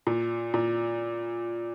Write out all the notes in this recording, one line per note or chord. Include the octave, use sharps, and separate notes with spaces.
A#2
A#2